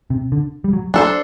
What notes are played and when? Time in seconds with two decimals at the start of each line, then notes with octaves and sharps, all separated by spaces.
0.10 C3
0.32 D3
0.64 G3
0.73 F#3
0.94 F#3 D4 A4 C5